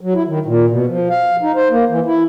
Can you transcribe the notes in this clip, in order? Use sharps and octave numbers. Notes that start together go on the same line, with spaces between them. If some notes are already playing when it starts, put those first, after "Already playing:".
F#3
E4
D#3
A#2
B2
F3
F5
D#4
C5
A#3
E3
E4